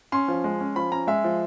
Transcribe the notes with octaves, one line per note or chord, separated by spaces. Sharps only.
C#4 C6
F3
G#3
C#4
F3 B5
C#4 A#5
G#3 E5
F3